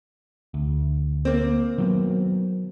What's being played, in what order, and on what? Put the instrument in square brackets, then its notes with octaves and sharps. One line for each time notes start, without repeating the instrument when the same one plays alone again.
[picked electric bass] D2
[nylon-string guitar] A#3 C4
[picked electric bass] D#3 F#3 B3